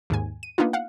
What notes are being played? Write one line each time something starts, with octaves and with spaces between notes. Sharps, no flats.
D#2 G#2 G#5
D#7
A#3 B3 D4 D#4 F4
F5 F#5